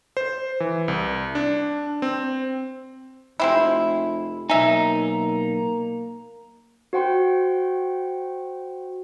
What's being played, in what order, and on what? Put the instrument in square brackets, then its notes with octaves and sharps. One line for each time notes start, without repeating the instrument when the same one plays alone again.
[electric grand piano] C5
E3
C2
D4
C4
[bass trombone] F1 [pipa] G#3 C4 E4
[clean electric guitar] B1 D#4 [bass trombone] A#3 [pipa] E5 G#5 [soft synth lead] A#5
[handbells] F#4 C5 F#5 G5 C6